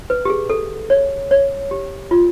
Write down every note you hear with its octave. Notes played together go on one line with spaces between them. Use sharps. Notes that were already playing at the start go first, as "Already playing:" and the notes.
B4
G4
G#4
A4
C#5
C#5
G4
F4